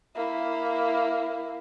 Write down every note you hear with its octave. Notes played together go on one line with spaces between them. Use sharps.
A#3 E4